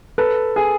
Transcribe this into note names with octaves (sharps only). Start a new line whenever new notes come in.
A4 B4
G#4